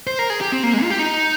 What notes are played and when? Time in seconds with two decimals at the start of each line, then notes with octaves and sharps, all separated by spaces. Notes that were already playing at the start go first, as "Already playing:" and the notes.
0.07 C5
0.19 A#4
0.30 G#4
0.41 G4
0.52 C4
0.63 A#3
0.74 G#3
0.83 F4
0.90 G4
0.99 D#4